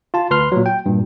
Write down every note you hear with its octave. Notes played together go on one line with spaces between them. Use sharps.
F4 A5
D2 B4 C6 F6
A#2 F#3
G5
G2 A#2